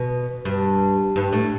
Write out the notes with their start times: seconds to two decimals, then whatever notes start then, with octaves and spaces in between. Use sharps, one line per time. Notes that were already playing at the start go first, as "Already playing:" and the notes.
Already playing: B2
0.45 G2
1.16 G2
1.33 A2